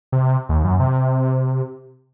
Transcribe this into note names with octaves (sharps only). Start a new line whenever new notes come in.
C3
D#2
F#2
C3